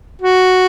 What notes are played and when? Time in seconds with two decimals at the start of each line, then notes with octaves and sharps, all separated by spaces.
0.22 F#4